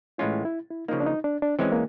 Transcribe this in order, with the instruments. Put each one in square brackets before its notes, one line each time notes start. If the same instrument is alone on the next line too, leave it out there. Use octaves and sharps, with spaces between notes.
[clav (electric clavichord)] A2 E3 G#3 C#4 F4 [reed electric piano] E4
[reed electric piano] E4
E4
[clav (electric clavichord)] C#3 F3 A#3 [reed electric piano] D#4
[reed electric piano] D4
D#4
D4
D4
[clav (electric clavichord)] E3 G#3 C#4 [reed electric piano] C4
[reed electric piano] A#3